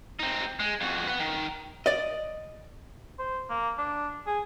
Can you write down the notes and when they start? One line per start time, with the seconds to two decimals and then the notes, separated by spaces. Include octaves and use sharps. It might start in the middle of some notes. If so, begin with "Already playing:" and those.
0.19 C4 D#4
0.60 G#3
0.81 F2 F#4
1.07 B4 F#5
1.20 D#3
1.86 D5 D#5
3.19 C5
3.50 A#3
3.78 D4
4.26 G#4